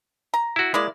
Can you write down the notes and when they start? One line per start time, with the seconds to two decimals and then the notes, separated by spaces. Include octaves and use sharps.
0.34 A#5
0.56 E4 F#4
0.74 G#3 A#3 E4 D5